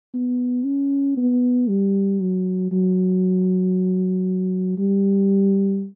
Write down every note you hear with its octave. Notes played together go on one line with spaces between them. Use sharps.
B3
C#4
B3
G3
F#3
F#3
G3